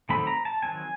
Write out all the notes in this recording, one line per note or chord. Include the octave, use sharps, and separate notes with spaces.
D#3 F#3 A3 C4 B5
A#5
A5
D#3 F#3 A3 C4 G#5